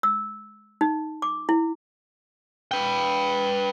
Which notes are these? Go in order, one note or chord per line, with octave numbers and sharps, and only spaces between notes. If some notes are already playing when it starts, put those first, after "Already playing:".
E6
D#4
D6
E4
B4 G5